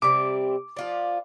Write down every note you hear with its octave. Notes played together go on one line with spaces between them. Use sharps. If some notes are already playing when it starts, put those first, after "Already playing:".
C3 G3 C4 D6
F3 F4 D5